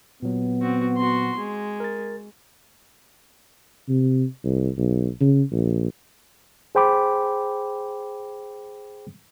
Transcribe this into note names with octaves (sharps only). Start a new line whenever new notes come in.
A#2 F#3 B3
C4 F#4
F#4 C6
G#3
A#4 A6
C3
C2
B1
C#3
A#1
G#4 C5 G5 B5 D6